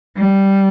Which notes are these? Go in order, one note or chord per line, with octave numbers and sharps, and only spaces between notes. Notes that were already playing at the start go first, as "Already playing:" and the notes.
G3